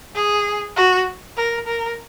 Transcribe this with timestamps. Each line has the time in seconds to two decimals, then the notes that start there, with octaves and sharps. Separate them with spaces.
0.15 G#4
0.76 F#4
1.37 A#4
1.67 A#4